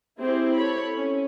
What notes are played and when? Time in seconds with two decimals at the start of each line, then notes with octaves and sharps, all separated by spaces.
0.20 C4 E4 G4 G#4 C5
0.57 A4 C#5 B5
0.95 C#4